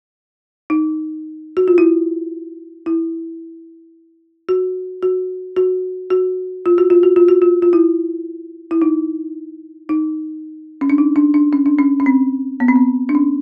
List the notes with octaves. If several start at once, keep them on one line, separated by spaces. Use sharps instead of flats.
D#4
F#4
F4
E4
E4
F#4
F#4
F#4
F#4
F4
F#4
F4
F#4
F4
F#4
F4
F4
E4
E4
D#4
D#4
C#4
D4
D#4
D4
D4
C#4
D4
C#4
C#4
C4
B3
C4
B3
D4
C#4